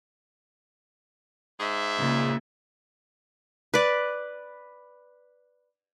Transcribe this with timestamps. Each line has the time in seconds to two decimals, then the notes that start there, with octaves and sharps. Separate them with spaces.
1.59 G#2 G#4 E5
1.98 A#2 C#3
3.74 B4 D5